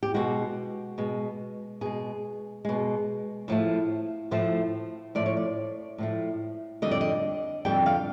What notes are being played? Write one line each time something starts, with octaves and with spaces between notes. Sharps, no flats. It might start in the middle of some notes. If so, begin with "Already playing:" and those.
G4
B2 G#3 F#4
B2 G#3
B2 G#3 G#4
B2 G#3
A2 F3 A3
A2 F3 A3 C5
A2 F3 A3 D5
C#5
D5
A2 F3 A3
F2 D3 G3 D#5
D5
D#5
F2 D3 G3 G5
F5